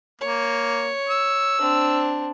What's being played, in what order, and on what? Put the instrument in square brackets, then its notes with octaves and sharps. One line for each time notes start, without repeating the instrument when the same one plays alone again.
[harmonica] A#3 [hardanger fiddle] C#5
[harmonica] E6
[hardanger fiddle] C4 D4